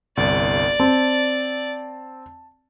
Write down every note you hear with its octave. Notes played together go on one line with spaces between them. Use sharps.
G1 C2 D5
C4 A5